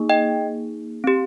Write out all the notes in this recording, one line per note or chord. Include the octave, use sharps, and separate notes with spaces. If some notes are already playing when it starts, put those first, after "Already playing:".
Already playing: A#3 D#4 G#4
D#5 G5
C4 G4